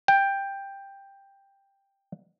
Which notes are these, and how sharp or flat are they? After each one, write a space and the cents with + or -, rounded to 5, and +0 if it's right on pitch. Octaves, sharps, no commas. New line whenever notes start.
G5 +10